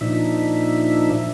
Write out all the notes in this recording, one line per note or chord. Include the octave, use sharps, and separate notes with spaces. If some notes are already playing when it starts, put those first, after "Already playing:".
A#2 F3 D4 D#4 E5